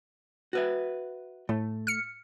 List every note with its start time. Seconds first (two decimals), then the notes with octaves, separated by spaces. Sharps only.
0.53 F#4 B4 E5
1.49 A2 A3
1.87 F6 C#7